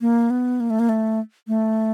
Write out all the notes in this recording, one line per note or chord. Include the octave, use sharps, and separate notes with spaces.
A#3
B3
A#3
A3
A#3
A3
A3